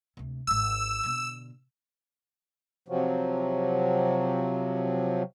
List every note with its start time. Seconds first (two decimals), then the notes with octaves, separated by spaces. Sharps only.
0.17 D2 C3
0.47 D#1 G#1 E6
1.03 B2 D3
2.88 C3 F3 F#3